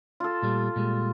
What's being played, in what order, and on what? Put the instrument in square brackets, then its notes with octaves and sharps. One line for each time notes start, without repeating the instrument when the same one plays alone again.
[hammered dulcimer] F4 A4
[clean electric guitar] A#2 G3 A3
A#2 G3 G#3